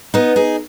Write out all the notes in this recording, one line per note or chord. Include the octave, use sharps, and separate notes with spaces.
B3 D#4
D#4 G#4